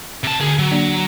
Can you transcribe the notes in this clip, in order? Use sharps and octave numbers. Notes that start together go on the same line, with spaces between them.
C3 A5
D2 D3 G#4
F#3
A#3 D4 D5